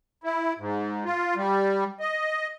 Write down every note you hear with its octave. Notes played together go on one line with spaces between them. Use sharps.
E4
G#2
F4
G3
D#5